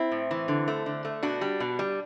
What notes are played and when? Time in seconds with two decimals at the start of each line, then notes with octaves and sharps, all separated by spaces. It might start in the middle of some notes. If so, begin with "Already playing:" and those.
Already playing: C4 E4
0.11 A2
0.31 E3
0.48 D3
0.68 A3
0.86 D3
1.05 A3
1.23 B2 D4 F#4
1.41 G3
1.60 B2
1.79 G3